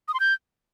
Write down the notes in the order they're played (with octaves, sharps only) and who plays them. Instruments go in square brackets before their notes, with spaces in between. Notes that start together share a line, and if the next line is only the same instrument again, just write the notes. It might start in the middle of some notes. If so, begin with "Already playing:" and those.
[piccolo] D#6
C6
G6